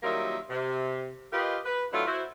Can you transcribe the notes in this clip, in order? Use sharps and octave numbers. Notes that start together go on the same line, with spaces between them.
D#3 F#3 G3 A#3 F4 E5
C3
F4 G4 A#4 B4 D#5
B4
F#3 A3 D4 E4 F4
E4 F#4 C5